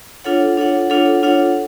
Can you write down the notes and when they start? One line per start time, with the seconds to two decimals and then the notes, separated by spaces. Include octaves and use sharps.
0.24 D4 F4 A4 C#5 F#5
0.58 D4 F4 A4 C#5 F#5
0.90 D4 F4 A4 C#5 F#5
1.23 D4 F4 A4 C#5 F#5